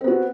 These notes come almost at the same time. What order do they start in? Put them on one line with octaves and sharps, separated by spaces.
C4 B3 F#4